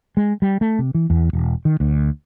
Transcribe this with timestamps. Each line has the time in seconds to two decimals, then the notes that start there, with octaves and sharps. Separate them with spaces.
0.17 G#3
0.42 G3
0.61 A3
0.79 C3
0.95 E3
1.10 E2
1.33 E1
1.65 D#3
1.80 D2